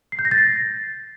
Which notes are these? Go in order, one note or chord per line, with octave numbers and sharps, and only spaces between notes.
C7
G6
A#6
A6
C7